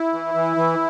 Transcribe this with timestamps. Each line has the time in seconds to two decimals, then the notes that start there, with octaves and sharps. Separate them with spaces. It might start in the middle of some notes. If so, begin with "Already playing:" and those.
Already playing: E4
0.13 E3
0.34 E3
0.56 E3